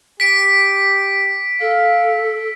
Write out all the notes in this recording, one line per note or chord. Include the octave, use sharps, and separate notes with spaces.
G4 B6 D7
A4 F5